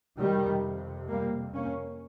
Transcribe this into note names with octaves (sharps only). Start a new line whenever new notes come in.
F2 C3 D#3 G3
G3 A#3
A#3 C#4